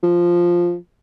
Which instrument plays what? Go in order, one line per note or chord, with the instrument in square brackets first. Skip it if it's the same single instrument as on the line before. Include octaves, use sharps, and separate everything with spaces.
[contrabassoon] F3